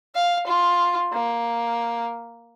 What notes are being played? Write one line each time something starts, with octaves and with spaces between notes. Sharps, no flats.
F5
F4
A#3